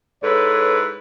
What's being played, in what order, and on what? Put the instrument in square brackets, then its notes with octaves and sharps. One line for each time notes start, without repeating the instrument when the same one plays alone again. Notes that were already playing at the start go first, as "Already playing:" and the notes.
[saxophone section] G#2 E4 B4 [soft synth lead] A4 [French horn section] C#5